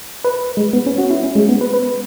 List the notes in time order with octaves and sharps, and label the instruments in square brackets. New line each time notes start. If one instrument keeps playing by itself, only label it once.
[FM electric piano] B4
G#3
B3
C#4
F#4
E4
C#4
G#3
B3
B4
B4